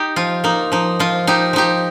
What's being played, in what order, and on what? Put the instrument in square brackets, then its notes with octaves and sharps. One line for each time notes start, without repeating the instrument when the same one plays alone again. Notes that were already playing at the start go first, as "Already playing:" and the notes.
Already playing: [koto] D#4 G4
F3 F4
A#3 D#4
F3 D#4
F3 F4
F3 D#4 G4
F3 D#4 G4